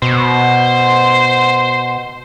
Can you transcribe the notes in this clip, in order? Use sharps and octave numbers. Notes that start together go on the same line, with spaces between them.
B2 C5